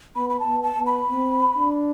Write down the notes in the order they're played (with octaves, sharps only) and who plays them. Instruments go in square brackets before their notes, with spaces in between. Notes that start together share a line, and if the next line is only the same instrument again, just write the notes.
[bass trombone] B3 [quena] B5
[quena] B5
A5
[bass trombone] B3
[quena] A5
[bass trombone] B3
[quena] B5
[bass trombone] C4
D4